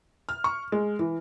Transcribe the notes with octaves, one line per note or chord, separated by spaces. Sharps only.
F6
C#6
G#3
E3